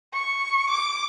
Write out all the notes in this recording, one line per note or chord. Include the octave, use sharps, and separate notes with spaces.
C#6
D6